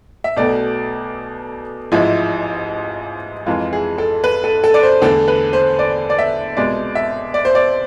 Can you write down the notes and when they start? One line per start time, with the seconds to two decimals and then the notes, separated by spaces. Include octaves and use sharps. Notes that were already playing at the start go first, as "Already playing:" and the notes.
0.24 E5
0.36 B1 B2 A3 D5
1.92 A1 G#2 F3 G#3 E4
3.46 F2 E3 G#3 F4
3.73 G#4
3.98 A4
4.24 B4
4.44 A4
4.64 A4
4.74 D5
4.83 C5
5.02 E2 D3 A3 A4
5.28 B4
5.53 C5
5.79 D5
6.10 D5
6.19 E5
6.57 C2 B2 G#3 D5
6.95 E5
7.34 D5
7.45 C5
7.55 D5